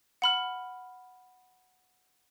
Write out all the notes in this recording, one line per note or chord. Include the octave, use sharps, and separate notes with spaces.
F#5 B5 F6